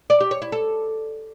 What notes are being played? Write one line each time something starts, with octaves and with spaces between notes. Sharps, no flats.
D5
G4
C#5
E4
A4